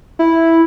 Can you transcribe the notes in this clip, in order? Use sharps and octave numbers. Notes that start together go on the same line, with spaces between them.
E4